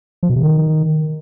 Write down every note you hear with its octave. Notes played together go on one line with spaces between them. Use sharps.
F3
B2
C3
D#3